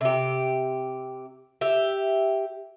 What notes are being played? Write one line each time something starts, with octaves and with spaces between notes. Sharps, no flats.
C3 G4
G4 E5